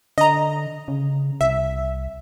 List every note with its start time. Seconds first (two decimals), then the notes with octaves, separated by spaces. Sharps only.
0.18 D3 D#5 A#5
0.88 C#3
1.41 C2 E5